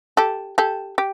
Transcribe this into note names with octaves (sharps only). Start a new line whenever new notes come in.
G4 A4
G4 A4
G4